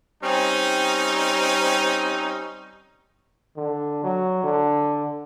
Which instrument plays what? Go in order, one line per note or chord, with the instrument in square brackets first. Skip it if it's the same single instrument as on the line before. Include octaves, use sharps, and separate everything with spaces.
[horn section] G3 C4 C#4 D#4
[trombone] D3
F#3
D3